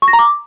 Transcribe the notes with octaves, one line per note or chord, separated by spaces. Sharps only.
C#6
A#6
A#5
D6